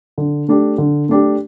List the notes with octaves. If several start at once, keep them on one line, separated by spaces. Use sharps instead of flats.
D3
A3 D4 G4
D3
A3 D4 G4